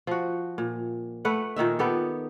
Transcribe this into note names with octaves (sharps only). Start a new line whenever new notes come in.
F3 F#4
A#2
A3 B4 F#5
A#2 D#3 D#4 E5
B3 G4 A4